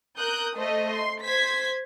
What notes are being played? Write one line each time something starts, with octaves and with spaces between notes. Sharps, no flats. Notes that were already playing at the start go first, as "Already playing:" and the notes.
A#4 D#6 F#6 G6
A3 C5 D#5 E5
C6
C5 G#6 B6